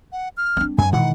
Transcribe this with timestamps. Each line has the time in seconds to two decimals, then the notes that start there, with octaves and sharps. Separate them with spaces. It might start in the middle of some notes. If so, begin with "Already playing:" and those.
0.12 F#5
0.37 F6
0.57 C4 D4
0.78 F#2 G#5
0.93 B2 D#3 E3 G#3 F#5